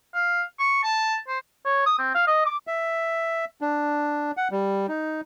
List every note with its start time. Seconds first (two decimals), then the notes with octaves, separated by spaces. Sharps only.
0.14 F5
0.59 C#6
0.83 A5
1.28 C5
1.65 C#5
1.86 D#6
1.99 C4
2.15 F5
2.27 D#5
2.46 D6
2.67 E5
3.61 D4
4.37 F#5
4.51 G3
4.88 D#4